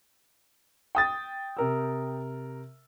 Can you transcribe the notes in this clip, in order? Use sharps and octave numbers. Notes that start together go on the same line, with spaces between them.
G5 D#6 A6
C3 A#4 E6